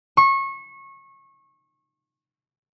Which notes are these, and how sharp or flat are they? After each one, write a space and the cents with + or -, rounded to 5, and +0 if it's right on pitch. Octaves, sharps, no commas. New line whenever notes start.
C#6 -25